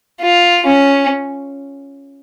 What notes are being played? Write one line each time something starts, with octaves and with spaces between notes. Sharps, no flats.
F4
C#4